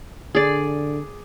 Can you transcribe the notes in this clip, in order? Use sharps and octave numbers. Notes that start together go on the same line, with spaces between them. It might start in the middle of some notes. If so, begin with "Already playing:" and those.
D3 G#4 D5